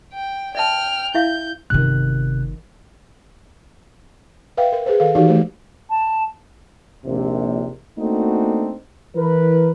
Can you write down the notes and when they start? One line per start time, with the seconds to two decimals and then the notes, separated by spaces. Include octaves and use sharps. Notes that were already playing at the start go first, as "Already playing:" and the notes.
0.13 G5
0.55 D5 E5 G5 A5 F6
1.15 E4 E5 F5 G6
1.70 G1 C3 D#3 F#6
4.57 B4 E5 F5 G5
4.72 A#4
4.86 G#4 B4 C5
5.00 D#3 A4 B4 F5
5.15 E3 D#4 F#4 G4 F5
5.29 F3 A3 C5
5.90 A5
7.05 A#1 D#2 C3
7.99 A3 A#3 C4 D4 D#4 F#4
9.16 E3 A#4 B4